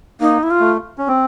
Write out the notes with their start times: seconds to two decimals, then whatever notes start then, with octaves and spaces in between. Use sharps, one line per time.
0.20 A#3 D#4
0.43 E4
0.51 F4
0.60 A3
0.98 C#4
1.08 C4